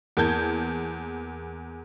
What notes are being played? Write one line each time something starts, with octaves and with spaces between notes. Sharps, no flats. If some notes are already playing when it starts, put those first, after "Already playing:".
E2 A#3 A5 G6 G#6